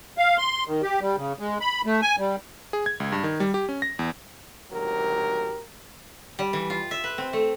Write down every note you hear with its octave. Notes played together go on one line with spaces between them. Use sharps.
F5
C6
D#3
G4
G3
C#3
G#3
B5
A3
G#5
G3
G#4
G#6
C#2
G2
D#3
G3
G4
C#4
A#6
E2
G#1 D2 F#3 G4 A#4
G3
E3
F4
E5
B4
C4
A3